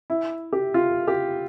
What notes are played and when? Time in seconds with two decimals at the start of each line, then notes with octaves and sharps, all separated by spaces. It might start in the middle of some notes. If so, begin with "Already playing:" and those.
0.10 E4
0.53 G4
0.74 F4
1.08 G4